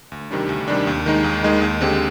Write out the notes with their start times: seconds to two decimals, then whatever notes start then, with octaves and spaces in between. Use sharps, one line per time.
0.12 D2
0.31 C3 D#3 G3 D4
0.49 D2
0.68 C3 D#3 G3 D4
0.87 D#2
1.06 D#3 G#3 D#4
1.24 D#2
1.43 D#3 G#3 D#4
1.62 D#2
1.81 D3 G#3 C4 G4